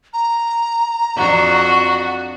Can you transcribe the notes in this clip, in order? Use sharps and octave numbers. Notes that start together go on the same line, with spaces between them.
A#5
F2 D4 F#4